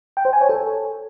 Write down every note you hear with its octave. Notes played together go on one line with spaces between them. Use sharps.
G5
C5
G#5
C#5
A4